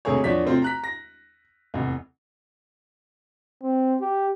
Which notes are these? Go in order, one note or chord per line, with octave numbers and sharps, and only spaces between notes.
E1 C3 A3 G#4 C#5
E2 F3 D4 C#5 B6
C3 A3 C4 F4
A#5 F#6 B6
A#6
F1 E2
C4
G4